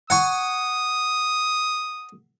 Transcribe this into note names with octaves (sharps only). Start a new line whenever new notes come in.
F#5 G#5 C#6 D#6